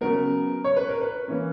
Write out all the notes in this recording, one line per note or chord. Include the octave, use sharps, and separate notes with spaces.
C#3 F#3 B3 A#4
C#5
B4
A#4
B4
E3 A#3 C#4